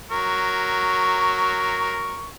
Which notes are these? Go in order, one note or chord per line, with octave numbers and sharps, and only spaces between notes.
F#3 A#4 C#6